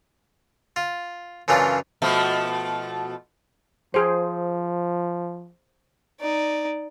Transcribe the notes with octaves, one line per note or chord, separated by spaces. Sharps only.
F4
F#2 C#3 E3 D4 F4
B2 F3 A3
F3 G#4 C5
D#4 D5